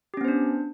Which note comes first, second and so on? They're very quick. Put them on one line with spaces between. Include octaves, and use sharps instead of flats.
G4 C#4 B3 C5 D4